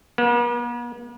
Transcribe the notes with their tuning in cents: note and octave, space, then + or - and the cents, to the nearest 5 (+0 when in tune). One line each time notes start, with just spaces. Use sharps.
B3 -45